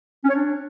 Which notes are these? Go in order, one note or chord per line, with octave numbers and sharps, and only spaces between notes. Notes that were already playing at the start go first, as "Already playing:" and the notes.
C#4
C#5
D4